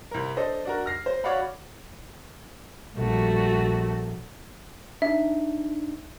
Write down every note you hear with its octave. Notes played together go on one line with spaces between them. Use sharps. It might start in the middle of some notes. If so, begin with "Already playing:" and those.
C2 A#4
D4 A4 C5 D#5
D4 F#4 A#4
F6 A#6 C7
C5
F#4 C#5 D5 F5 F#5 B5
A#1 G3 A3 F#4
D4 D#4 E5